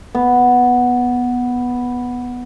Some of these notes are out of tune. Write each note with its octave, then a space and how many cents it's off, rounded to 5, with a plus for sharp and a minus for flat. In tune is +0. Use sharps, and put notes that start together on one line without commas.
B3 -5